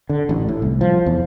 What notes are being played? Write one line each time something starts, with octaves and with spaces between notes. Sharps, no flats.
D3
A1
A2
C2
F3
E2